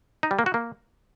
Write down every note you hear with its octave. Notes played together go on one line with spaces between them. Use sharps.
D#4
G3
A#3
F#4
A#3